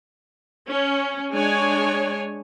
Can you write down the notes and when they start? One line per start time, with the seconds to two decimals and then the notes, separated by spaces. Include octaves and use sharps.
0.67 C#4
1.32 G#3 D4 C#5 G#5